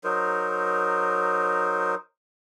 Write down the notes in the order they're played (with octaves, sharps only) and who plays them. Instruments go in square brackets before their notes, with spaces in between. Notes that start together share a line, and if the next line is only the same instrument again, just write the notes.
[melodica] F#3 D#4 A#4 C5